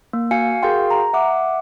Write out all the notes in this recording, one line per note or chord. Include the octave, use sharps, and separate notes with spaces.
A#3
F#4 F5 G#5 C#7
F#4 G#4 A#4 F5 G5 C6
A#5
E5 F#5 D6